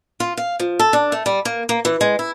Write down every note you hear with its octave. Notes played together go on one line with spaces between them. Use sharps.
F4
F5
F3
A4
D4
A3
G3
A#3
A#3
E3
G#3
E4